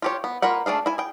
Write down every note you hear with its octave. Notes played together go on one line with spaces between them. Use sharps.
F4 G4 C#5
B3
A#3 F4 A#4 B4 F#5
A3 D4 G#4 F5
E4 G#5
G#4 G5